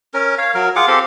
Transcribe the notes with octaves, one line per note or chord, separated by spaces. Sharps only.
C#4 A#4
C#5 F5
F#3 A#4
F4 G#4 F#5 D6
C4 G4 A4 F5